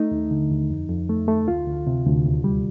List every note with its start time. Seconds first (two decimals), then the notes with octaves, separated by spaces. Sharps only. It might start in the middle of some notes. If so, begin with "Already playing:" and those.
Already playing: A3 D#4
0.11 D#2
0.31 D3
0.51 D#2
0.70 F2
0.89 F2
1.09 A3
1.28 A3
1.48 D2 F4
1.67 D2
1.87 C3
2.06 D2
2.26 D#2
2.44 G3